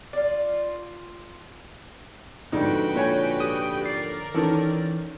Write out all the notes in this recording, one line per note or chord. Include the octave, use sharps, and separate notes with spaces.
F4 D5
F2 G#2 D3 D#4 F#4 B4 G5
A#2 C#5 G#5
G4 D#6
A#4 D5 C7
D#3 E3 C#4 A4